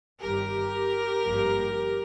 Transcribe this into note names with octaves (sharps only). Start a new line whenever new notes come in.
G1 G2 D#3 G4 A#4
G#1 G2 F3 A#3